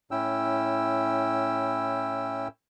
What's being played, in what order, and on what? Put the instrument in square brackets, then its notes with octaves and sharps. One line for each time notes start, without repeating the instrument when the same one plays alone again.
[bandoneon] A2 C#4 E4 G5 E6